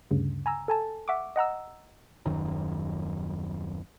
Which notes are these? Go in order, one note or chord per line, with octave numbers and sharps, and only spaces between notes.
D2 G2 C#3
G#5 A#5 E6
A4 G#5 A5
E5 F#5 C#6 D6
D#5 F#5 A#5 E6
D#1 F#2 D#3 F#3